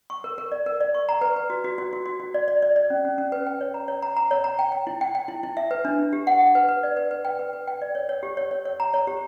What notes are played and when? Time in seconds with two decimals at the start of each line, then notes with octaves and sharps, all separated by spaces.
0.10 C#6
0.24 A#4
0.38 A#4
0.52 D5
0.66 A#4
0.81 D5
0.94 C#6
1.09 A#5
1.21 B4
1.36 B4
1.50 F#4
1.64 F#4
1.78 F#4
1.93 F#4
2.06 F#4
2.20 F#4
2.34 D5
2.48 D5
2.62 D5
2.76 D5
2.90 C#4
3.05 C#4
3.18 C#4
3.32 B4
3.46 G5
3.61 C#5
3.74 A#5
3.88 C#5
4.02 A#5
4.17 A#5
4.31 C#5
4.44 A#5
4.59 G5
4.72 G5
4.87 E4
5.01 G5
5.15 G5
5.28 E4
5.43 E4
5.57 E5
5.71 B4
5.85 D4
5.99 D4
6.13 G4
6.27 F#5
6.41 F#5
6.55 B4
6.69 B4
6.83 D5
6.97 B4
7.11 B4
7.25 G5
7.39 B4
7.53 B4
7.67 G5
7.82 D5
7.95 C#5
8.09 C#5
8.23 G4
8.37 C#5
8.51 C#5
8.65 C#5
8.80 A#5
8.94 C#5
9.07 G4